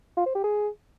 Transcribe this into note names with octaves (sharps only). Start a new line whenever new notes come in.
F4
C5
G4
G#4